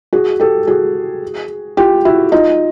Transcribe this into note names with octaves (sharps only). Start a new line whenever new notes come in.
F#4 G#4
G4 A4
F#4 G#4
F4 G4
E4 F#4
D#4 F4